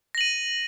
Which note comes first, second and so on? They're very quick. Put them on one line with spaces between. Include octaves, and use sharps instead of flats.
A#6 F#7 D#7